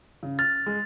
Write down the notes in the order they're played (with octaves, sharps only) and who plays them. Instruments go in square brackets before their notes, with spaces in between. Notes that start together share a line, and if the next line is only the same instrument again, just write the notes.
[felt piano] C#3
[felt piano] F6 [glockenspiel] A6
[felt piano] G#3